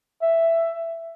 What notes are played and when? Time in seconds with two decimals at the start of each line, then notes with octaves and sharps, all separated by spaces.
0.22 E5